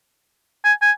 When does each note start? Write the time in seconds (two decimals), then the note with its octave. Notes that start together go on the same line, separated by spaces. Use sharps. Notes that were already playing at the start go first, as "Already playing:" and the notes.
0.65 G#5
0.82 G#5